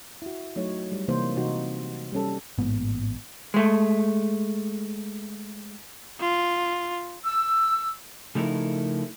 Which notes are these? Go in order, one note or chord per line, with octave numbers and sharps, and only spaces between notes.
E4 F#4
F#3 A3 D#4 C#5
G3
C3 E3 A#3 D#4 C5
C3 E3 D#4 F#4
G3 C#4 A4
A1 G#2 A#3 B3
G#3 A3
F4
E6
C#3 F3 A3 D#4 E4 A#4